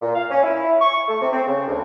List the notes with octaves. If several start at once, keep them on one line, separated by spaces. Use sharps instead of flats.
A#2
F5
C#4
E4
C#6
A3
C3
C4
C#3
D2